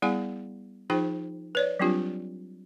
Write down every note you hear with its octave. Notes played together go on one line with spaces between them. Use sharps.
G3 B3 E4 G#4 F5 G#5
F3 D#4 F4 G#4 C5 G5
B4 C#5 D5
F#3 G3 C4 D4 F4 G4